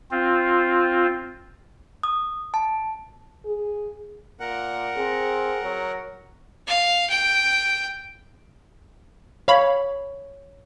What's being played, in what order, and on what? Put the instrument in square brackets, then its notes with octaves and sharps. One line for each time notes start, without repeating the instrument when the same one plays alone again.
[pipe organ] C4 F4
[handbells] D#6
A5
[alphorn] G#4
[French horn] A#2 [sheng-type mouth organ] A#4 F#5
[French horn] C4 [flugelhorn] G#4
[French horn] F#3
[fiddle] F5
G5
[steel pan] C#5 [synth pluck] F5 B5